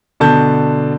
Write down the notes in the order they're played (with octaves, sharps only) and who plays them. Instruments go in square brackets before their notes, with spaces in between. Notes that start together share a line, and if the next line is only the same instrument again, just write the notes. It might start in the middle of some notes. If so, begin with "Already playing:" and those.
[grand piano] B2 D3 A5 G6